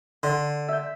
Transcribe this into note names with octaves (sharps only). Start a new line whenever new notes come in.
D3 C6
E5 G6